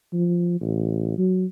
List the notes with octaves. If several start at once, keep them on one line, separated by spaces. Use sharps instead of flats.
F3
A1
F#3